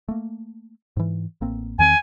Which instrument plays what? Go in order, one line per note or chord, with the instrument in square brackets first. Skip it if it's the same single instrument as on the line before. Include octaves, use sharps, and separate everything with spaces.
[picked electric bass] A3 A#3
G#2 E3
A1 A#3 C4
[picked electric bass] E2 D#3 C4 [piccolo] G#5